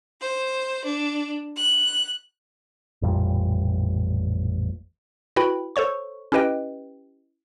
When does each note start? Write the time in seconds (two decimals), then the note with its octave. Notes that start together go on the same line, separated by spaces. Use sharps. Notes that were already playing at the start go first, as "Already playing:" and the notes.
0.20 C5
0.85 D4
1.56 F#6
3.02 A1 F2 A#2 G3
5.36 E4 F#4 B4 G5 B5
5.76 A4 C5 C#5 C#6
6.32 C#4 E4 G4 B4 D#5 G5